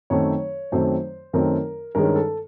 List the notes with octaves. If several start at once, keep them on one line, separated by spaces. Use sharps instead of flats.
F#2 D#3 F#3 A3 C4 C#5
F#2 D#3 F#3 A3 C4 C5
F#2 D#3 F#3 A3 C4 A#4
G2 D#3 G#3 C#4 A#4
A4